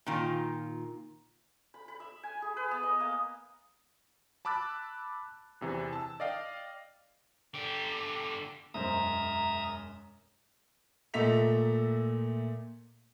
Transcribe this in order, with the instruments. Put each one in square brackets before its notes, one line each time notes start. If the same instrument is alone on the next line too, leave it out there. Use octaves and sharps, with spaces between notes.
[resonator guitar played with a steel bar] A#2 D#3 F4
[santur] B5
B5
E5
G#5
G#4
B4
B3
D#5
A#3
[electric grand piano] A5 B5 D6 E6 F#6 A6
E2 C3 E3
A5 E6
D5 D#5 F5 G5
[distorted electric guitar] D3 G4
[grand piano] E1 F#2 C5 [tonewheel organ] E5 A#5 D#6
[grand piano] A#2 A3 D#5 E5 B6 F7